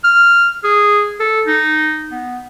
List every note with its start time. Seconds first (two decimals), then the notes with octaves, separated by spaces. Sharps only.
0.04 F6
0.64 G#4
1.20 A4
1.47 D#4
2.11 B3